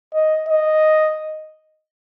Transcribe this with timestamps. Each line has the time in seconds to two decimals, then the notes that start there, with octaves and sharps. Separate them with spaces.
0.14 D#5
0.49 D#5